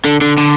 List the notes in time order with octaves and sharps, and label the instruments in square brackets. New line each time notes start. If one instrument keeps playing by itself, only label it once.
[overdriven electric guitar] D3
D3
D3